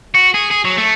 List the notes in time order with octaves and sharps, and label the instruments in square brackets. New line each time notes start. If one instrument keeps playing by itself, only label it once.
[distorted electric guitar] F#4
G#4
G#4
F#3
A3